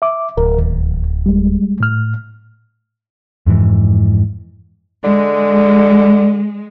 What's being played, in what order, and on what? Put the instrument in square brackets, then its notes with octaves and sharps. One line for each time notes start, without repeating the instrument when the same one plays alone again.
[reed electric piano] E5 D6
[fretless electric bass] D1 [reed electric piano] A#4
[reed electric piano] D#2
G3 G#3
A2 F6
[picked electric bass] F2 G#2 E3
[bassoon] D3 [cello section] G#3